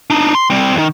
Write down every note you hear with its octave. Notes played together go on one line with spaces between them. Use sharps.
D4 D#4
C6
G3 C4
E2 D#3